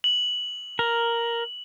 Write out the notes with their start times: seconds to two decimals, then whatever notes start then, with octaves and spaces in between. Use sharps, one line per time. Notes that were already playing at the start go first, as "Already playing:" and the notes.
0.04 F#7
0.79 A#4